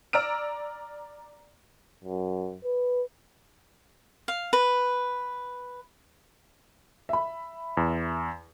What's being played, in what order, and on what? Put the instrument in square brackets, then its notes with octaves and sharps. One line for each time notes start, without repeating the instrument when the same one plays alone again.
[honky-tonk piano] D5 A#5 E6 F6 D7
[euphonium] F#2
B4
[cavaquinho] F5
B4
[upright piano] E5 B5
[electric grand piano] E2